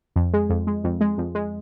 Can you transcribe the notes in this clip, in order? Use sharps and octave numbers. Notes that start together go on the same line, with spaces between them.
F2
G#3
F2
G#3
F2
G#3
F2
G#3